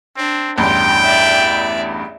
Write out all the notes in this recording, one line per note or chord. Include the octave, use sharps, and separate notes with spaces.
C4 D4
A1 E2 G2 G5 C6
D5 E5